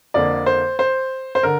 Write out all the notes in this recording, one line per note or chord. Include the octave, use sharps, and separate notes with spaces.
F2 D3 A#3 D5
C5
C5
C5
D3 A#4